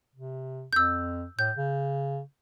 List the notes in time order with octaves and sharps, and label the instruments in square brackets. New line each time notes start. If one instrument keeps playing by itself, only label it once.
[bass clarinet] C3
[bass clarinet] F2 [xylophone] E6 G6
[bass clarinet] A2 [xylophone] G6
[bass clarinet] C#3